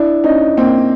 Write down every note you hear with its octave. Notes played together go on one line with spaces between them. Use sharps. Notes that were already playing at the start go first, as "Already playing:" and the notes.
Already playing: D4 E4
C#4 D#4
A#3 C4